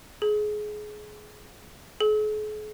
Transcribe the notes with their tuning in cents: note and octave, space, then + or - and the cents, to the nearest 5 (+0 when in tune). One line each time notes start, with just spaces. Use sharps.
G#4 +20
G#4 +45